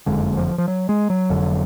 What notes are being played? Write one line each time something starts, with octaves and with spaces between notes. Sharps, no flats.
F#1 F2 D3 G#3
F3
F3
F#3
G#3
F#3
F1 F2 D3